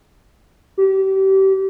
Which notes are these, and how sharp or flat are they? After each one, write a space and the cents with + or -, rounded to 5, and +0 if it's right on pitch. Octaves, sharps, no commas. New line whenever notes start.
G4 -30